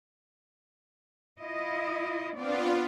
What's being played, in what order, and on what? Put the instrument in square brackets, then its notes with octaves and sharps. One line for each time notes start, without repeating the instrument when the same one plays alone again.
[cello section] E4 F4 D#5
[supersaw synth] B3 F4 [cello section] C4 D4 D5